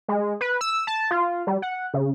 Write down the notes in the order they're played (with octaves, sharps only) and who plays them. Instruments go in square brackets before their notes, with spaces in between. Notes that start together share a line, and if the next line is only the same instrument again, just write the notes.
[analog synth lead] G#3
B4
E6
A5
F4
G3
F#5
C#3